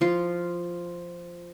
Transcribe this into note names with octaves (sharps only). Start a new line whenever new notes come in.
F3 F4